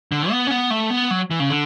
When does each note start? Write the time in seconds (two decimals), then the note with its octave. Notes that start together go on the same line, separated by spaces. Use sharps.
0.12 D3
0.31 B3
0.47 C#4
0.51 B3
0.70 A3
0.90 B3
1.11 F#3
1.31 E3
1.40 C#3
1.50 D3